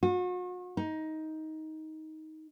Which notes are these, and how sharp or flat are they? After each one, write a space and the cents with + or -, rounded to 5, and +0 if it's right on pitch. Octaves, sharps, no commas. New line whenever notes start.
F#4 -40
D#4 +15